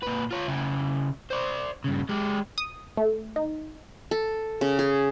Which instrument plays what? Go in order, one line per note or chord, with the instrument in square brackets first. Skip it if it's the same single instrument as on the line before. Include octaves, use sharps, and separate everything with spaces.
[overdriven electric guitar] A#2 B4
F4 C#5
C#3 E4
C5 D5
G2 C#3
G#3 G4
[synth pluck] D#6
A3
D#4
[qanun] A4
C#3
G#4